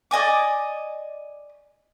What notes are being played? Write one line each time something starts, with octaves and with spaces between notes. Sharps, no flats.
D5 D#5 G#5 D6